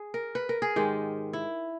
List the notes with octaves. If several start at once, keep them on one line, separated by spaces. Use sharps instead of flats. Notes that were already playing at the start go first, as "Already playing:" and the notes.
Already playing: G#4
A#4
B4
A#4
G#4
G#2 D#3 G#3 G4
E4